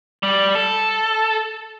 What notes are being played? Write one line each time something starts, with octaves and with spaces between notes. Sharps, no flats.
G3
A4